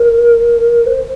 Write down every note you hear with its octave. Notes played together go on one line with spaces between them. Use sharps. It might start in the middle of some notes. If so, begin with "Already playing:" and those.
Already playing: A#4
C5